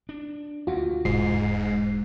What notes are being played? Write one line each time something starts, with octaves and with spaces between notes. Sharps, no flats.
D4
D2 F4 F#4
E1 G#2 G#3 C7